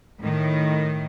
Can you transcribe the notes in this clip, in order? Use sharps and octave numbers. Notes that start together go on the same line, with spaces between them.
A2 D#3